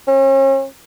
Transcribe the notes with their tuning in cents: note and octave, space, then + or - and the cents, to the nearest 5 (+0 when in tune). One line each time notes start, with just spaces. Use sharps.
C#4 -40